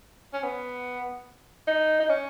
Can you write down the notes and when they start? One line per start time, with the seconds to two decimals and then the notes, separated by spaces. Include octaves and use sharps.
0.33 C#4
0.43 B3
1.67 D#4
2.00 D#4
2.09 C#4